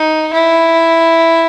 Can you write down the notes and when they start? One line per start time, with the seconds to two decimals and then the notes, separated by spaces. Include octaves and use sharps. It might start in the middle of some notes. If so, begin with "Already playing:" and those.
Already playing: D#4
0.33 E4